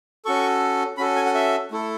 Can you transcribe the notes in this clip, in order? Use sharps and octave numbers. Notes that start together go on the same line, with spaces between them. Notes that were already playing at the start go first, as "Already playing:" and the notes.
C#4 F#4 A4 C#6
C#4 F#4 A4 B5
G#5
F#5
E5
A3 E4 A4